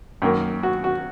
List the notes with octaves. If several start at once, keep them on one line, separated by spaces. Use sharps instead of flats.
F#2 D#3 A#3
F#4
F#4